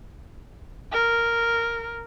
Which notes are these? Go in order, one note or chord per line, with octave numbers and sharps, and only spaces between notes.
A#4